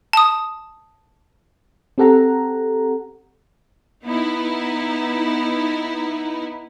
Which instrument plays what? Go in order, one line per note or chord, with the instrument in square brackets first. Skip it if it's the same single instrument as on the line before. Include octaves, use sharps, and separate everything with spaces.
[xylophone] A5 D#6
[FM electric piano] C4 G4 A4 F#5 A#5
[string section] B3 D#4 E4